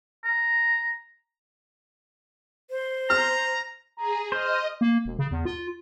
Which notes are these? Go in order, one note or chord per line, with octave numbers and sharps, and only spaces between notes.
A#5
C5
A#5 F6
G#4 A#5
C5 D#5 F6
A#3
E1
C#3
E2
F4